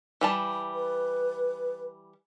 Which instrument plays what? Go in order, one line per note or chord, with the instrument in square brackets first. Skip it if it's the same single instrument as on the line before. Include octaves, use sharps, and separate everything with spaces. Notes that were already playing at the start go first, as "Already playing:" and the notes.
[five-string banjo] E3 G3 A5
[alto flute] B4